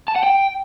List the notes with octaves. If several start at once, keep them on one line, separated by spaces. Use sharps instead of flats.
A5
F#5
G5